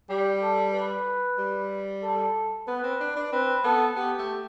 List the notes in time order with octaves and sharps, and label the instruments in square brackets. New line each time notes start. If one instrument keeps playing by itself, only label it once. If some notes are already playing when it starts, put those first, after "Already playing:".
[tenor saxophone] G3 [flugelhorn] G4
[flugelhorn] A4
B4
[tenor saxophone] G3
[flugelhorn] A4
[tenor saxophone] B3 [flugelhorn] B4
[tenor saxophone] C4
D4
D4
[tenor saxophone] C4 [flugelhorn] B4
[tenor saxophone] B3 [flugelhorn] A4
[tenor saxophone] B3 [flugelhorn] G4
[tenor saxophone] A3